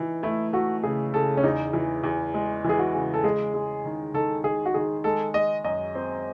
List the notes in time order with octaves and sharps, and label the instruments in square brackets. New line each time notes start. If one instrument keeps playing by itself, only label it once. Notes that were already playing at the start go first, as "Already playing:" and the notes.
Already playing: [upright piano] E3 D#4
[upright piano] A3 [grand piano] E4
[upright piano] A3 [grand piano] F#4
[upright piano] C#3 [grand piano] G#4
[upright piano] C#3 [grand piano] A4
[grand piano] C#4
[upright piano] E2 [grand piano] D#4
[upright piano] E3
E2
G#3
[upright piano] E3 [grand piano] G#4
[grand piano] F#4
[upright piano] C#3
[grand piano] A4
[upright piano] G#3 [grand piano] G#4
[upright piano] G#3
D#3
[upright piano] D#3 [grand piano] A4
[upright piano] D#3 [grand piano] G#4
[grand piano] F#4
[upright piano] D#3 [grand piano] G#4
[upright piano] G#3 [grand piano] A4
[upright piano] G#3 [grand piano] D#5
[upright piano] F#2 [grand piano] D#5
[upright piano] C4